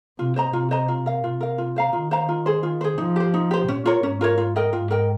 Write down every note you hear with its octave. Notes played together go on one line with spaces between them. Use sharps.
C3 F4
C5 D#5 A#5
C3 F4
C5 D#5 A#5
F4
A#4 F5
C3 F4
A#4 F5
F4
C5 F5 A#5
D#3 F4
C5 F5 A#5
F4
G#4 C5
F4
G#4 C5
F3 D#4
G4 C5
D#4
G4 C5
A#2 C#4
F4 A#4 C#5
G#2 C#4
F4 A#4 C#5
F4
A#4 D#5 G5
G#2 F4
A#4 D#5 G5